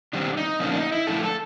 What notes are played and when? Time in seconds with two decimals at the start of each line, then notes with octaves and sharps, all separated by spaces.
0.13 D#3 G3 C4 D4
0.37 D#4
0.60 D3 F3 A#3 C#4 D4
0.71 D4
0.76 D#4
0.92 E4
1.07 F3 A3 D4 A4
1.24 A4